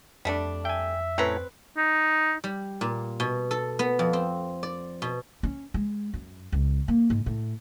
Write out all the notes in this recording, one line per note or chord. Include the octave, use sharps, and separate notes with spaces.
F2 G3 A3 D4
E5 G5 G#5
A2 C4 C#4 B4 A#5
D#4
G3
A#2
B2
A4
B3
F2
C4
D5
B2
C#4
G#3
F#2
C#2
A#3
G#2
A2